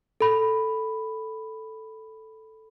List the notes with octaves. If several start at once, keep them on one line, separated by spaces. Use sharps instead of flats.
A4 B5